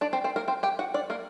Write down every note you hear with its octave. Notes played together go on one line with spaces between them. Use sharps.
D4 D5
C4 C5
C4 C5
A#3 A#4
C4 C5
G4 G5
F#4 F#5
D4 D5
A#3 A#4